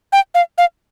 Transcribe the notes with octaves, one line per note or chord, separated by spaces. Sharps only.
G5
F5
F5